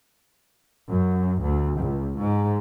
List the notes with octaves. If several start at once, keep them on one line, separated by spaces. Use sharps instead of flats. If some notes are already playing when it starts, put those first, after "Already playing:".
F#2
D2
C#2
G#2